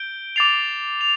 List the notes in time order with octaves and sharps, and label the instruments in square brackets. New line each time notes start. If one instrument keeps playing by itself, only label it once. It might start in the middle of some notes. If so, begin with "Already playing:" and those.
Already playing: [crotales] G6 D7 G7
D6 A6 C7 F7
F7